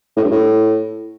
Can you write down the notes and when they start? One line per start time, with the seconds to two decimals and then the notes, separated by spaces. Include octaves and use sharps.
0.17 A2
0.24 G2
0.31 A2